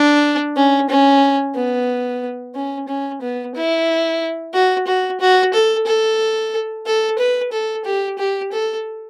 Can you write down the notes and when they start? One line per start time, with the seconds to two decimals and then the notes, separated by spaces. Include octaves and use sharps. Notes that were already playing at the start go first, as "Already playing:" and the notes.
Already playing: D4
0.56 C#4
0.89 C#4
1.56 B3
2.55 C#4
2.88 C#4
3.21 B3
3.55 E4
4.54 F#4
4.87 F#4
5.20 F#4
5.53 A4
5.86 A4
6.86 A4
7.19 B4
7.52 A4
7.85 G4
8.18 G4
8.52 A4